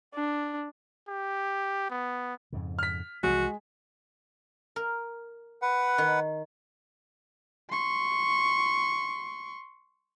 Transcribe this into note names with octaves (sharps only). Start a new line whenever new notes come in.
D4
G4
B3
F2 G#2 C#3
F6 B6
C2 E3 F3 G#3 F#4
A#4
B4 F#5
D#3
C6 C#6